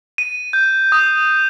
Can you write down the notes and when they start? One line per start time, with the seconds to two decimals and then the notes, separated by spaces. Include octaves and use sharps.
0.18 D#7
0.53 G6
0.92 D#6